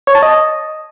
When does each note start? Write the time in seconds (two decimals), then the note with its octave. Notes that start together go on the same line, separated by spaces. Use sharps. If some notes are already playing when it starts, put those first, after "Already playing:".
0.07 C#5
0.15 A5
0.22 D#5